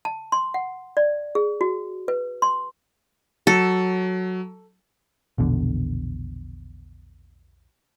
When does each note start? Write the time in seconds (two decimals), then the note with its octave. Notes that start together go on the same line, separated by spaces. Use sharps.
0.05 A5
0.32 C6
0.54 F#5
0.97 D5
1.35 G#4
1.61 F#4
2.08 B4
2.42 C6
3.47 F#3 A4
5.38 A#1 E2 B2 D3